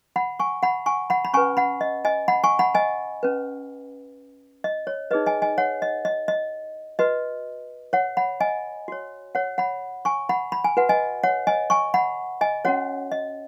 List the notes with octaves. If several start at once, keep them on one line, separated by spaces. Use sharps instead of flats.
F#5 B5
G#5 C#6
F#5 B5
G#5 C#6
F#5 B5
B5
C#4 B4 G#5 C#6
F#5 B5
D#5
D#5 G#5
F#5 B5
G#5 C#6
F#5 B5
D#5 G#5
C#4 B4
D#5
C#5
D#4 G#4 B4 D#5
D#5 G#5
D#5 G#5
C#5 F#5
D#5
D#5
D#5
F#4 B4 D#5
C#5 F#5
F#5 B5
D#5 G#5
F#4 C#5
C#5 F#5
F#5 B5
G#5 C#6
F#5 B5
B5
G#5
F#4 B4 F#5
D#5 G#5
C#5 F#5
D#5 G#5
G#5 C#6
F#5 B5
D#5 G#5
C#4 F#4 C#5 F#5
D#5